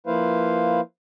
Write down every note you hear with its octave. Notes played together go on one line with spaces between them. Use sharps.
F3 A#3 E4 B4 C5 F5